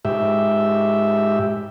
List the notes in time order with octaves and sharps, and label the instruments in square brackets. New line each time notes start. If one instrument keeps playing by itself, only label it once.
[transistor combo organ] G#2 G4 E5